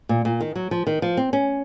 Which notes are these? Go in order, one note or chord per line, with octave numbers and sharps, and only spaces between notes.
A#2
A#2
D#3
F#3
F3
D#3
F3
C4
C#4